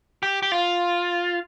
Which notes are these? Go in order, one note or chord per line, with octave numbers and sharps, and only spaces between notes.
G4
G4
F4